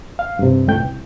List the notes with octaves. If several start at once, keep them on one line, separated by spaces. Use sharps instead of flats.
F5
G2 C3
C#2 G#2 A3 G5 G6
C2